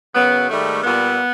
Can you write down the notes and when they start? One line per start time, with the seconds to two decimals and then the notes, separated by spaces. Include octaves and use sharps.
0.15 F#2 C#3 F#3 B3
0.49 G#2 D#3 G3 A3
0.84 A#2 G3 B3